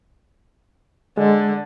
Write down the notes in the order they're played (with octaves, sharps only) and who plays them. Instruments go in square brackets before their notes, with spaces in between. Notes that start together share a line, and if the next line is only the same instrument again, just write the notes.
[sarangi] D3 [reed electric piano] G#3